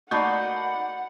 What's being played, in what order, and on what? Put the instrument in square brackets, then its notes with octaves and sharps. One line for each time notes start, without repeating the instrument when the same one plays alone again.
[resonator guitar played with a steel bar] A3 A#3 D#4 [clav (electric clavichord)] F#4 [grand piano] D5 B5 G6 [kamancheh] F#5